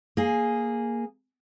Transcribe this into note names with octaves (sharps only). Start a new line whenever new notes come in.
A#3 G#4